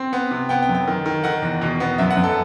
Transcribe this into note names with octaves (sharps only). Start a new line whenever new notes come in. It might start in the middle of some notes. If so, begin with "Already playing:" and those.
Already playing: C4
B3
C3
B3 G5
G5
F#2
G5
D#3
D#3
D#3 F#5
E2
B2
B3
F#2 E5
F#5
F#2
A4